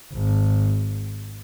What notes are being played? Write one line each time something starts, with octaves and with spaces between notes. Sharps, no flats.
G#1